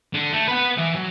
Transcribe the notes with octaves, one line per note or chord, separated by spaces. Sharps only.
D3
A3
B4 F#5
E3
F#3